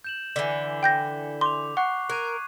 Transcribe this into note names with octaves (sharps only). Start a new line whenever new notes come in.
G6 E7 F#7
D3 E3 B6 G7
G5 G6 A#6
C6 D6 F7
F#5 C#6 F#6 C7
A#4 F#6 G#6 D#7